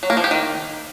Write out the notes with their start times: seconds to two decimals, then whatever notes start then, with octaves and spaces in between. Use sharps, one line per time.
0.03 F#3
0.10 A#3
0.17 F3
0.24 G4
0.31 D#3